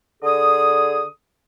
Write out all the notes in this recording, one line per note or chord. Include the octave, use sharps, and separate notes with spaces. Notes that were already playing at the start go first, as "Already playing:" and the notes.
D3 G#4 D#6